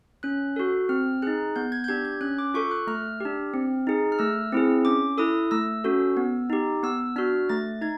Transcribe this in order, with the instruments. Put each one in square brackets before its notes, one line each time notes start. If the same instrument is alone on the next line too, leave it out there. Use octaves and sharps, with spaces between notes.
[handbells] C#4 F#6
F#4 A4
C4 F6
D#4 G#4 F#6
B3 G6
G#6
G6
D4 G4 G#6
G#6
C#4 F#6
D6
F4 A4 C#6
F#6
A3 F6
D4 G4
C4
D#4 G#4
F6
A3 E6
C4 E4 G#4
C#4 D6
E4 A4 D#6
A3 E6
C#4 F#4 A4
B3
D#4 G4
B3 E6
D4 F#4 F6
A3 A6
D#4 G#6